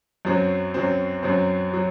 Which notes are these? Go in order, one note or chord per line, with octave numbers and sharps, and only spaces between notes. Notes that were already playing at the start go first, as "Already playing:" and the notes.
F#2 F#3 C4
F#2 F#3 C4
F#2 F#3 C4
F#3